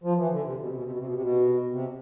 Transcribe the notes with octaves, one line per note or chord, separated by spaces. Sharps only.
F3
E3
D3
C3
B2
C3
B2
C3
B2
C3
B2
C3
B2
C3